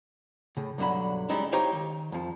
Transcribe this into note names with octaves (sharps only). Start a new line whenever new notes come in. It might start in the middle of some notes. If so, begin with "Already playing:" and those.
A2 C#3
B1 G2 D3 F#3 B5
G3 G#3 C#4 D#4 E4
D#4 G4 C5 C#5 F5 G5
D#3
F2 F3